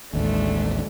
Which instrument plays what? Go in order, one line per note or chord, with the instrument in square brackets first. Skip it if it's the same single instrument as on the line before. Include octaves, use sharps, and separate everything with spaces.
[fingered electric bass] A1 D#2 [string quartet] G#3 A3 D4